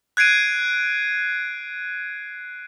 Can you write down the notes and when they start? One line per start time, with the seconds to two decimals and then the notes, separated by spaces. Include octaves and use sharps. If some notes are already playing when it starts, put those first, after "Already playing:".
0.17 F#6 G#6 C7 D7 D#7